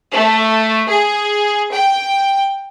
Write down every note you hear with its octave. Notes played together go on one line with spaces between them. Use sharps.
A3
G#4
G5